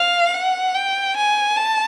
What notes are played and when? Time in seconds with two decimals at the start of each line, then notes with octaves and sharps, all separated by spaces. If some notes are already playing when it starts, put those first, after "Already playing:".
Already playing: F5
0.34 F#5
0.75 G5
1.17 G#5
1.56 A5